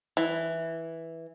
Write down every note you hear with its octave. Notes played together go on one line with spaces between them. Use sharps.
E3